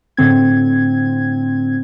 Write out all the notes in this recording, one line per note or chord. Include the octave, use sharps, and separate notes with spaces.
A2 D3 C4 G#6